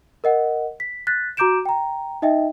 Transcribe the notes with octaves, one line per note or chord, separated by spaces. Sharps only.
A#4 D#5 F#5
B6
F#6 A6 B6
F#4 A#5 D6 G6 D7 E7
G5 A#5
D#4 D#5 E5 G5